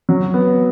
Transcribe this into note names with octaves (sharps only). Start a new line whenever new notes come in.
F#3
B3